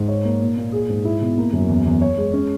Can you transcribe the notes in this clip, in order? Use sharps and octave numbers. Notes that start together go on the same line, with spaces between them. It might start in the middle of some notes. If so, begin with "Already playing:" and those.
Already playing: G#2
C#5
A#3
A#2
A#2
G#4
G#2
E4
B2
A#3
F#2
E2
E2
C#5
G#3
C#4